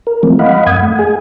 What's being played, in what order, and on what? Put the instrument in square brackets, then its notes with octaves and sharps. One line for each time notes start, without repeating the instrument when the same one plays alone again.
[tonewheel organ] A#4
E3 F3 G#3 A3 C4
D#5 F5 F#5 B5
F#2 F#5 D#6 G#6
A3
G#4 G#5